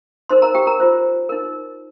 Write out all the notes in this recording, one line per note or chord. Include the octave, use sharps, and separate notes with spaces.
D#4 A#4 C5 C6
A#4 A#5
G4 G5
A#4 A#5
F4 C5
D#4 A#4